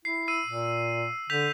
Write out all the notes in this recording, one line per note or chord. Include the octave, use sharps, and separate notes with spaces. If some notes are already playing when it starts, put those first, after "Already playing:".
E4 C7
E6 C7 D#7
A#2
D3 G6 B6 F7